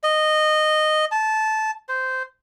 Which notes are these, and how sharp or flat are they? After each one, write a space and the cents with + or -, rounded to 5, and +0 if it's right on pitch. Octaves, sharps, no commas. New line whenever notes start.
D#5 -15
A5 -15
C5 -10